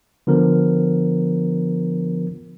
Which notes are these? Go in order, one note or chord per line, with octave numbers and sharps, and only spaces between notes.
D3 F3 B3 A#4